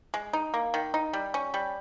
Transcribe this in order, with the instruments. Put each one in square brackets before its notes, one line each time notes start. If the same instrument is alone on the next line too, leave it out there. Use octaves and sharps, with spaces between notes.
[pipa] G#3
D#4
A#3
D#3
D#4
G3
C#4
G3